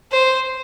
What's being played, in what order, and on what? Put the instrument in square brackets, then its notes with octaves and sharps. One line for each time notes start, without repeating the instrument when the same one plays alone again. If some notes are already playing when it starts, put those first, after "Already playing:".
[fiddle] C5